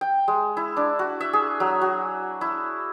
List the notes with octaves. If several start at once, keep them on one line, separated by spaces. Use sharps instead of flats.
G5
G#3
E4
D4
F#4
E5
G#4
F#3
F#4
E4